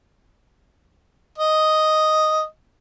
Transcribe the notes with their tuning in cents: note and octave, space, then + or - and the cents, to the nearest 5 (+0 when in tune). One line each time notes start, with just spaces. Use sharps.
D#5 +0